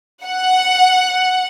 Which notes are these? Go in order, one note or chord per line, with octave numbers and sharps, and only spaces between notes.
F#5